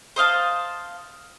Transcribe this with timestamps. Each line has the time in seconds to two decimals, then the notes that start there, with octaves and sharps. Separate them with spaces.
0.16 C5 D#5 F5 A5